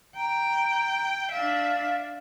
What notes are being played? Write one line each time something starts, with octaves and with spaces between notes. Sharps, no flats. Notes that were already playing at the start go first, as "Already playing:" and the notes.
G5 A#5
D4 E5 F5